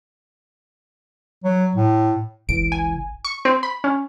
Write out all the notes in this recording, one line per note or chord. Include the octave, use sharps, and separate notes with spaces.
F#3
A2
G1 C#2 E3 D7
G#5
C#6
C4
B5
C#4